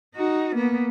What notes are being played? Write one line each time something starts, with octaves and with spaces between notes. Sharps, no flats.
D#4 F#4
A#3 B3